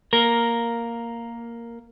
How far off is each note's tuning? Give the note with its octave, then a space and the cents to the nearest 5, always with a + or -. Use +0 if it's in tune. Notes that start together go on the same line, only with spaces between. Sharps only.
A#3 +0 A#4 +0